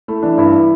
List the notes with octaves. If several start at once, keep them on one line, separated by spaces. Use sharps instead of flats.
A3 E4
E3 D4
G2 E4